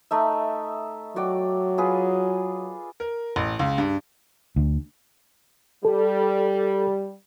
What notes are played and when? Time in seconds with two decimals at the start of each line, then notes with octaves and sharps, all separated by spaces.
0.11 A3 D#4 E5
1.16 F#3 F#4 D5 G5
1.78 F4 G#4 B4
3.00 A#4
3.36 A1
3.59 C#2
3.78 G2
4.56 D2
5.85 G3 A4